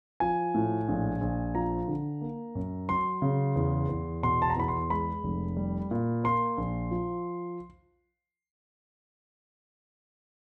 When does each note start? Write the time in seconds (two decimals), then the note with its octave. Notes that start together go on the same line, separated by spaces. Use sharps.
0.20 F3 G#5
0.54 A2
0.88 A#1
1.21 A#1
1.55 F3 A#5
1.88 D3
2.21 A#3
2.55 F#2
2.89 F#3 C6
3.22 C#3
3.56 E2
3.89 E2
4.23 B2 C6
4.42 A5
4.50 A#5
4.56 E2 B5
4.68 C6
4.90 G#3 B5
5.23 F1
5.57 G3
5.91 A#2
6.24 A#3 C6
6.58 A#1
6.91 F3